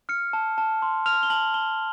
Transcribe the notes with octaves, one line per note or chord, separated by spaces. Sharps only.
F6 C#7
A5
A5
C6
F6 F7
G7
A5 F#7
A5 G7